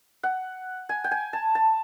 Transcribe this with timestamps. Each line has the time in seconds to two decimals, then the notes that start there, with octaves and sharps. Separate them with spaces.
0.23 F#5
0.89 G#5
1.04 G5
1.11 G#5
1.33 A5
1.55 A5